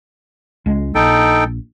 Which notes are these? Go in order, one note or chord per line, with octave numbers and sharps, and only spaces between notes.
C#2 G#3
A#1 D#4 A4 G5